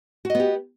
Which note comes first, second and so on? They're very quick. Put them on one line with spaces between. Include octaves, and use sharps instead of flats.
F#4 D#5 B3 G4